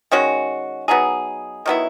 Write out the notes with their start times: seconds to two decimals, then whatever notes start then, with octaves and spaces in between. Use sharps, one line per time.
0.11 D#3 G#3 C#4 F#4
0.88 F#3 B3 D#4 G#4
1.66 D#3 F#3 B3 E4